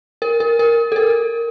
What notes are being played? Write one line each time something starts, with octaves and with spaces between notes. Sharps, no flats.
A#4
A#4
A#4
A4
A#4